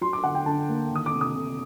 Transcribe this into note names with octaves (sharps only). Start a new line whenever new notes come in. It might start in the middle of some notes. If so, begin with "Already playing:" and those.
F#3 C6
D6
D3 F#5
G5
D3 A5
A#3
D#3
D#6
D6
C3
D#6
C3